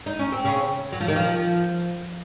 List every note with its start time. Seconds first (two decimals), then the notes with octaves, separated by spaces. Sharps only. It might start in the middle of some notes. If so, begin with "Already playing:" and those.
0.06 D#4
0.19 C#4
0.32 C4
0.45 C#3 C#4
0.92 F#3
1.00 F3
1.08 D#3
1.16 F3